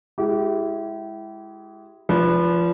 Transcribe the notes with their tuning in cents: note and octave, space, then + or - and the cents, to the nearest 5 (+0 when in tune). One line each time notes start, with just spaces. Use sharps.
G#3 +0 E4 +5 G4 -35
F3 -20 B4 -5 D5 -45